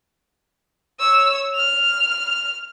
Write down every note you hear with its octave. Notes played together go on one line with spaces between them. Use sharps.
C#5 E6
F6 F7